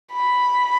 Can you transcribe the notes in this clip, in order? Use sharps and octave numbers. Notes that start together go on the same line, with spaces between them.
B5